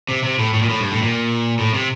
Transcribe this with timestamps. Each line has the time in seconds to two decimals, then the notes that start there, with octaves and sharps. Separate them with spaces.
0.09 C3
0.23 C3
0.39 A2
0.54 A2
0.62 A#2
0.69 A2
0.80 G2
0.91 A2
1.02 A#2
1.59 A2
1.74 C3